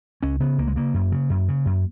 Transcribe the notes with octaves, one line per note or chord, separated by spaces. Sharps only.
C#2 C#4
C#3 B3
C#2 A#3
G#3
C#3 A#3
F#2
C#3
F#2
C#3
F#2